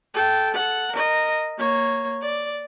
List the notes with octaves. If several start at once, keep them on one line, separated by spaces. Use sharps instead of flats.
A4 G5
A4 F#5
A#4 D#5
A#3 C#5
D5